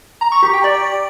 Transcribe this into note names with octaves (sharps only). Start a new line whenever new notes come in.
A#5
C#6
G4
G5
D5